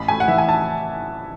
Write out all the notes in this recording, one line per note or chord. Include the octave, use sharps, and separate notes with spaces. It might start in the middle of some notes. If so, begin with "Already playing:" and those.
Already playing: A1 B5
A3 G#5
F#5
E3 E5
G#5
A5